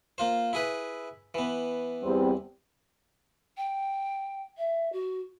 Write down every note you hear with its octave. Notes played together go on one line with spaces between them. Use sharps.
A#3 F4 C5
E4 G#4 B4
E3 B3
E2 G3 C4
G5
E5
F#4